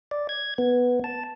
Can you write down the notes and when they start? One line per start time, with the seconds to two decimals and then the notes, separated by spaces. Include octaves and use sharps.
0.11 D5
0.29 G#6
0.58 B3
1.04 A5